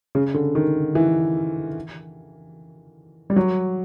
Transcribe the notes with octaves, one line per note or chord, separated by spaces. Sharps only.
C#3
D3
D#3
E3
G3
F#3